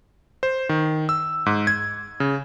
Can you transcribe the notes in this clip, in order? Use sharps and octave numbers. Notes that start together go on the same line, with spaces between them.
C5
D#3
E6
G#2
G#6
C#3